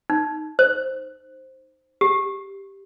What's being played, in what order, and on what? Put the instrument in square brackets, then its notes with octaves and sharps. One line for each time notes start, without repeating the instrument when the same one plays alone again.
[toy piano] D#4
C5
G4